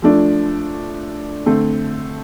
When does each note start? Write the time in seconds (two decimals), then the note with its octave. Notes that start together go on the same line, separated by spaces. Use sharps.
0.02 F3 A3 D4
1.46 D3 A3 C4